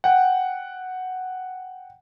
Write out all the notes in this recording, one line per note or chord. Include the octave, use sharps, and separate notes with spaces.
F#5 G5